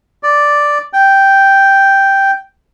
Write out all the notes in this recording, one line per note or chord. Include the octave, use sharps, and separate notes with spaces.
D5
G5